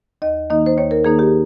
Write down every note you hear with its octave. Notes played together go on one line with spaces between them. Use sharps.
D#2 D#5
D#3 A#3 D#4 D#5
C5
D#2 C#5
A#4
D#3 A#3 D#4 G#4
G4